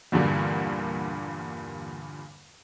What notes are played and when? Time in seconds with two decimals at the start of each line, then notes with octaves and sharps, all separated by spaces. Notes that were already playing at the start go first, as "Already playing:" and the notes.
0.12 E2 G2 A#2 D3 G3 A#3